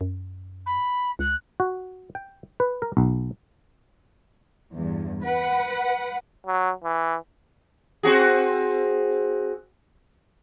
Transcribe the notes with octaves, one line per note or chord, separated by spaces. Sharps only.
F#2
B5
C#2 F#6
F#4
G5
B4
A#4
B1
E2 G2
B4 F#5
F#3
E3
C4 F#4 G#4